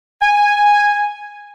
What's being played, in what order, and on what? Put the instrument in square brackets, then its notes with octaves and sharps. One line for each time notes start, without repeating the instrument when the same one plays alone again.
[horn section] G#5